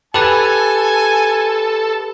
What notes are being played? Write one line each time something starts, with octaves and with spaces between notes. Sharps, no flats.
G4 A4 B4 G#5 A5